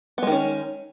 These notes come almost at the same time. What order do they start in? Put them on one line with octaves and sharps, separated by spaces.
B3 G#3 D#3 C#4